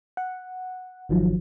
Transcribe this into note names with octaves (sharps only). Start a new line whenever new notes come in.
F#5
G#1 D#3 F3 F#3